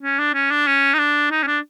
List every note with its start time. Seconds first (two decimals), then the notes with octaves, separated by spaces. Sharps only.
0.03 C#4
0.19 D4
0.34 C#4
0.51 D4
0.67 C#4
0.94 D#4
0.99 D4
1.31 D#4
1.43 C#4
1.47 D4